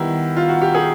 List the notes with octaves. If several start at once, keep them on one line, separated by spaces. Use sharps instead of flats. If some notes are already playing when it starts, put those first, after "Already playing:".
Already playing: D#3 G3 B3 E4
F4
F#4
G4
G#4